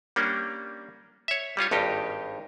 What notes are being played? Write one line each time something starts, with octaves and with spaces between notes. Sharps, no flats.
G3 A#3 C#4 D4
C#5 E5
G3 C#4 F4 C#5
G#1 G2 D#4 G4